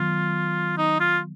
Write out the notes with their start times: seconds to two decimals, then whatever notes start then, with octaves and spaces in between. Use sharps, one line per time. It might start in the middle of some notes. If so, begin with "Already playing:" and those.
Already playing: D#3 F#3 B3 F4
0.78 D#4
1.00 F4